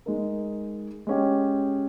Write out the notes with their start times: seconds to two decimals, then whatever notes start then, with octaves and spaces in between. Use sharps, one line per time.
0.06 G#3 D#4 A#4
1.07 G#3 C#4 G4